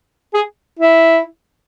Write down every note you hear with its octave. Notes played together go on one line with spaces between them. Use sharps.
G#4
E4